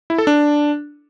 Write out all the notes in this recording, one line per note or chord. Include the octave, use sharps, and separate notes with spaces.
E4
A4
D4